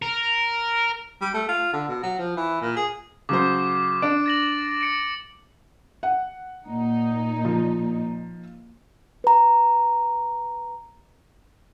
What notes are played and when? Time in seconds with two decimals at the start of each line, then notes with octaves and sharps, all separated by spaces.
0.02 A#4
1.21 G3
1.34 A3
1.49 F4
1.73 D3
1.88 B2
2.03 F#3
2.19 F3
2.36 E3
2.61 A#2
2.76 G#4
3.29 C#3 F#3 C5 D6
4.02 D4 D7
4.26 A6 A#6 F#7
4.81 A#6 C#7 D7
6.03 F#5
6.67 A#2 D#4
7.45 F3
9.24 B4 A#5